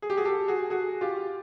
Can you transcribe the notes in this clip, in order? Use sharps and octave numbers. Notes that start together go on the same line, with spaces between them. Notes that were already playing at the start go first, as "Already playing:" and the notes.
G#4
G4
F#4 G#4
G4 A4
F#4 G#4
F#4 G#4
F4 G4